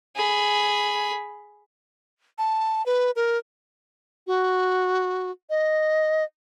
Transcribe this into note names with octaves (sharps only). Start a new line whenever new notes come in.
G#4 B5
A5
B4
A#4
F#4
D#5